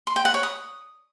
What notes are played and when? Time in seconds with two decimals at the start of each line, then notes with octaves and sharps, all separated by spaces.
0.07 C6
0.16 G5
0.25 F#5
0.34 C#5
0.43 D#6